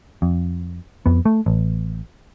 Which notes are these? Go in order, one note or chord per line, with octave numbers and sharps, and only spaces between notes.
F2
F2 B3
A3
A1